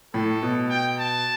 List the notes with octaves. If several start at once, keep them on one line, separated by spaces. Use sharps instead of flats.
A2 A4
B2
G5
A5